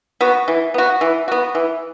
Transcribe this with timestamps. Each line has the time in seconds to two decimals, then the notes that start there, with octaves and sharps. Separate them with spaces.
0.21 B3 F#4
0.48 E3
0.74 B3 F#4
1.01 E3
1.28 B3 F#4
1.55 E3